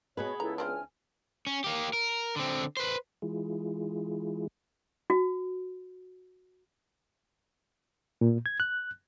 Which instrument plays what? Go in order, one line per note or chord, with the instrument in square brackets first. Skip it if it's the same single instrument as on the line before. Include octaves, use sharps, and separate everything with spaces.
[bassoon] B2 [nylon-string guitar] B3 G#4 B4 [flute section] C#5 D#5
[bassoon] C#2 [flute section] E4 A4 C#5 [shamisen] A#5
[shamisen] E3 C4 D4 [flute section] G#5 F6
[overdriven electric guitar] C#4
A#3 G4
A#4
D3 C4
B4 C5
[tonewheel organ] E3 G#3 E4 F4 G#4
[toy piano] F#4
[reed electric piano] A#2
G#6
F#6